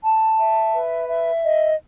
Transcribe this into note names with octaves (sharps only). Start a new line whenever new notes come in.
A5
E5
B4
E5
D#5